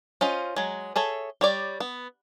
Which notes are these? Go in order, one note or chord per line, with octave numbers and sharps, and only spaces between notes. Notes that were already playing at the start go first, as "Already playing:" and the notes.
C#4 F4 C5 D#5
F#3 G#3
G#4 A4 C#5 E5
G3 C#5 D5
B3